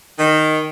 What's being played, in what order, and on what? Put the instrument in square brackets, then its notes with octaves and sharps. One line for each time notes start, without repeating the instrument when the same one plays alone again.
[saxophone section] D#3